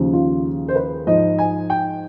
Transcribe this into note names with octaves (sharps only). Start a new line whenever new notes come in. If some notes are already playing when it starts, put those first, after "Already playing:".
Already playing: D#2 C#3 F3
F4
C5
B4
G#2 F3 D#5
G#5
G5